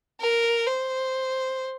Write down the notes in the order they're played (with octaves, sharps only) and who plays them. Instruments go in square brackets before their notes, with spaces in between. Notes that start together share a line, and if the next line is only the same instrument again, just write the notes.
[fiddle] A#4
C5